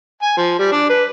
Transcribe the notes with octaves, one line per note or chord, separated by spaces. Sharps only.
G#5
F3
G3
D4
B4